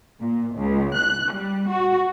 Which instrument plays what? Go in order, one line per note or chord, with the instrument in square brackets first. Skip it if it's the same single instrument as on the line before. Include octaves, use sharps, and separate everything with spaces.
[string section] A#2
C#2
F#6
G3
F#4